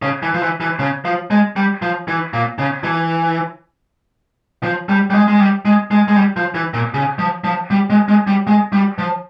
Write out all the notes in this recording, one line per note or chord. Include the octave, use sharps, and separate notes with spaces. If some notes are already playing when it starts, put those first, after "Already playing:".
C#3
E3
F3
E3
E3
C#3
F3
G#3
G3
F3
E3
A#2
C#3
E3
F3
G3
G3
G#3
G#3
G3
G#3
G#3
G#3
G3
F3
E3
A#2
C#3
F3
F3
G3
G#3
G#3
G3
G#3
G3
F3